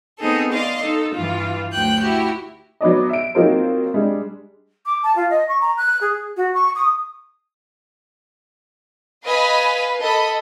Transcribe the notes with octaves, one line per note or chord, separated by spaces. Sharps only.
B3 C4 D#4 G#4 A4
D5 D#5 F5 C6
D#4 A4
G2 E3 F4
D2 F#3 G5 F#6 G6
E4 F#4 G4
F#3 B3 D5 D#5
E5 D7
F#3 A#3 C4 D#4 F4 C5
G3 G#3 D4
D6
A5
F4
D#5
C#6
A#5
F#6
G#4
F#4
C#6
D#6
B4 D#5 F5 G#5 B5
A4 D#5 B5